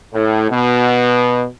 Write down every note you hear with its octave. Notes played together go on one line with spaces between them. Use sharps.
A2
B2